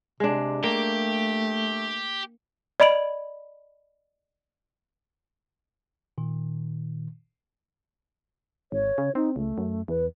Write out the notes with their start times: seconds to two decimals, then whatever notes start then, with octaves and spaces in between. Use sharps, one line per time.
0.20 C3 G#3 D4
0.64 A3 A#3 G4
2.80 D5 D#5 B5 D7 F#7
6.18 A#2 D#3
8.72 G#1 C#5
8.98 C#3
9.15 C4 D#4
9.36 C#2 A3
9.58 F#2
9.88 E2 B4